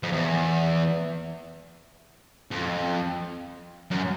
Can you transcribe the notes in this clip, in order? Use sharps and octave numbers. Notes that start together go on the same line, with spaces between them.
F2
E2
F2
F#2